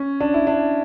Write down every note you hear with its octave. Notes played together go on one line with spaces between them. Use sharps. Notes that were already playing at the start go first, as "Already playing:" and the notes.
Already playing: C#4
D4
E4
D4